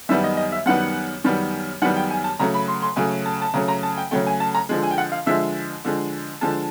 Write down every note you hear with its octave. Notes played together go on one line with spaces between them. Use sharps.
F#2 D#3 G3 B3 E5
D#5
D#5
E5
F#2 D#3 G3 B3 F#5
F#2 D#3 G3 B3
F#2 D#3 G3 B3 F#5
G5
G#5
A5
C#3 F#3 A3 A#5
B5
C6
C6
C#3 F#3 A3 G#5
A5
A5
C#3 F#3 A3 A#5
A#5
A5
G5
C#3 F#3 A3 G5
G#5
A5
A#5
D3 F3 G#3
G#5
G5
F#5
F5
D3 F3 G#3 E5
D3 F3 G#3
D3 F3 G#3 A5